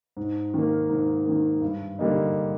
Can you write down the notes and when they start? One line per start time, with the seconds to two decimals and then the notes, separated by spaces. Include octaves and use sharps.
0.17 G#2
0.54 D#3 A#3
0.89 G#2
1.26 D#3 A#3
1.62 G2
1.99 D3 G3 A#3 D#4